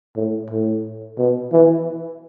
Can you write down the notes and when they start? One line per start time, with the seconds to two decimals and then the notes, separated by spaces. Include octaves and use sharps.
0.16 A2
0.50 A2
1.18 B2
1.52 E3